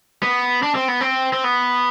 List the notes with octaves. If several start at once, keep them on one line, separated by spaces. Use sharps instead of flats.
B3
D4
C4
B3
C4
C4
B3